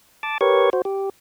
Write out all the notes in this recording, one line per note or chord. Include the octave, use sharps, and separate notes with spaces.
A5 D6
G4 A#4 B4 C#5 C#6
F#4 C5
G4